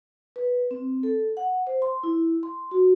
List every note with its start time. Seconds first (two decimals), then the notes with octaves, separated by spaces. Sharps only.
0.36 B4
0.71 C4
1.03 A4
1.37 F#5
1.67 C5
1.82 C6
2.03 E4
2.43 C6
2.71 F#4